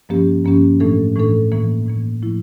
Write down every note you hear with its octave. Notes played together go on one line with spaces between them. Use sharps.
G2 F3 A#3 C#4 G4
G2 F3 A#3 C#4 G4
A2 E3 A3 D4 A4
A2 E3 A3 D4 A4
A2 E3 A#3
A2 E3 A#3
A2 F3 A3 E4